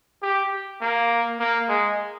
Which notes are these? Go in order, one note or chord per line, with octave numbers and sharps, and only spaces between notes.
G4
A#3
A#3
G#3